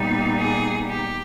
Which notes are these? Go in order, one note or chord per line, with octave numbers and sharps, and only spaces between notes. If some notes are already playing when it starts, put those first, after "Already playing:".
Already playing: A#2 G3 B3 D#4
G#4
G4